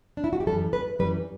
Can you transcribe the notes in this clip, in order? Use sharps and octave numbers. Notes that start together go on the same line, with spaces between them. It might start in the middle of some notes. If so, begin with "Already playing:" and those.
D4
E4
F#4
G4
F#2 E3 G3 A4
B4
F#2 E3 G3 B4